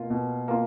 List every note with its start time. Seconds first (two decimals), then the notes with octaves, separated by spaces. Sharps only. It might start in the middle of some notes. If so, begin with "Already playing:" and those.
Already playing: B2 A#3 F4
0.10 B2
0.48 A#3 F4